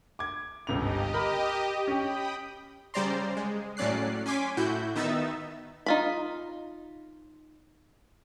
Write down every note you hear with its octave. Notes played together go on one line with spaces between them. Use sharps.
D6 G#6
G1 C#2 G4 D#5 F7
A#4 B5
C#4 G4 G5 B5 D#6
C#3 G3 C5 D5 A#5 C6
G#3
A2 F#3 C#4 D5 F#6 C7
C#4 G#5 C6 D6 B6
A2 E4 F#4 G6
D#3 B3 D#4 E5 E6 A6
D#4 F4 B5